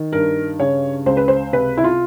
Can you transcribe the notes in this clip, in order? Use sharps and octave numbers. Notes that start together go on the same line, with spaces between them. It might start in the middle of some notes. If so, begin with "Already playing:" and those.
Already playing: D#3
G2 A#4
C#3 C#5
C#2 C5
B4
C5
C3 B4
E4
F4